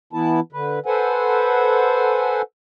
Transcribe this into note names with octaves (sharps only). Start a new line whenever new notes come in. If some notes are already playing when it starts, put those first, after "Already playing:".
E3 B3 E4 A5
D3 B4
A4 B4 C5 F#5 G#5